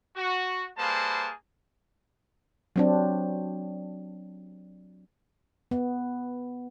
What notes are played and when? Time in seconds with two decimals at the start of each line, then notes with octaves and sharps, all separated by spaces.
0.17 F#4
0.78 G3 A#3 G#4 B4 C5 A5
2.76 F#3 C4 D4
5.71 B3